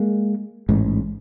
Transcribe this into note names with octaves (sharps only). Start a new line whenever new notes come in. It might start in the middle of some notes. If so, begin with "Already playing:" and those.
Already playing: G#3 A#3
A1 G#2